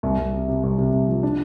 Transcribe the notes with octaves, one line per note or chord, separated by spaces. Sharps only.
C2
C2
C3
C3
C2
C3
C2
F3
D4